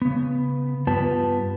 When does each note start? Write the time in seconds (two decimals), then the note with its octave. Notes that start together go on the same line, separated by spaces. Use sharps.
0.02 C#3 B3
0.87 G2 B3 F4 G4 B4 A5